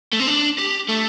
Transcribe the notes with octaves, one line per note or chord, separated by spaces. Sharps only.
A3
C4
D4
G4
A3